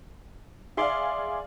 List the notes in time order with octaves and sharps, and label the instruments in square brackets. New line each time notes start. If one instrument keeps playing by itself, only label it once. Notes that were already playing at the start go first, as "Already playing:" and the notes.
[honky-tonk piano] G#4 D5 F5 [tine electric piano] E5 C6 D6